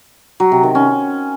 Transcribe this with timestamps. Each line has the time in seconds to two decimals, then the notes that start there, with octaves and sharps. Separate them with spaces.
0.40 F#3
0.52 C3
0.63 D#3
0.75 C#4